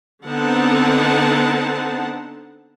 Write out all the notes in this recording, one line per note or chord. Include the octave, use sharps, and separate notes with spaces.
D3 B3 C4 D#4 F#5 A5